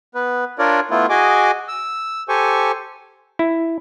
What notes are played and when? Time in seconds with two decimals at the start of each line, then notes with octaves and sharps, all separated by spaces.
0.15 B3 B4
0.59 D4 F4 A#4 C#5 D5
0.91 A3 B3 E4 F4
1.10 F#4 G#4 D#5 G#5 D6
1.68 E6
2.29 G4 A4 C5 G#5 C#6
3.39 E4